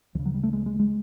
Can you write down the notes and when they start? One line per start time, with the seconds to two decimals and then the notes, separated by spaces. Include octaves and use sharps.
0.15 D2 F3
0.19 C#3
0.26 F#3
0.34 G3
0.43 A3
0.53 G#3
0.66 G#3
0.79 G#3